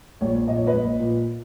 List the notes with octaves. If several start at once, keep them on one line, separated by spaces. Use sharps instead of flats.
A#1 C#5
A#2 D#5
C#5
B4 D#5
A#1
A#2